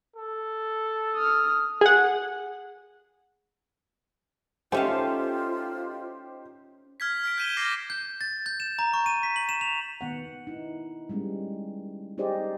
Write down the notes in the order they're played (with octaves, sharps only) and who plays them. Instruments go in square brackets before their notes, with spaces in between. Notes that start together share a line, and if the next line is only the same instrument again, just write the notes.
[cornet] A4
[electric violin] D#6 F6
[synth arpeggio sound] G#4 F#5
[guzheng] A3 C#4 F5 [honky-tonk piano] D#4 G4 C5 [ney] F4
[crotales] F6 G#6 B6
F6 B6 D7
G6 B6 D#7 E7 G7
D6 F6 G#6 A#6 C7
[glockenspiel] G6
A6
G6
E7
A#5
C#6
D#7
B6
F#7
E7
F7
[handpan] D#3 B3 F#5
D#4 E4
G3 G#3 B3 C#4
D#4 G4 G#4 C5 D5 D#5